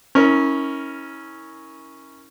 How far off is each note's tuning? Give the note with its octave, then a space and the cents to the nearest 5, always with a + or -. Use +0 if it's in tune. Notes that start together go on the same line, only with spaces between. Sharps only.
C#4 +0 E4 -35 A#4 +0